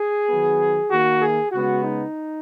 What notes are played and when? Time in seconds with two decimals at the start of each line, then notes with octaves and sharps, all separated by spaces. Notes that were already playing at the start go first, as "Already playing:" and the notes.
Already playing: G#4
0.27 D#3 F#3 B3
0.89 D#3 A#3 F#4
1.20 G#4
1.52 C#3 G#3 B3 F#4
1.83 D#4